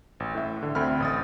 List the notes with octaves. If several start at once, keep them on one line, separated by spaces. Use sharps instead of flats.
A1
A2 E5
D3
D2 D3 C4 E5 B5 F6
A1 D#6 A6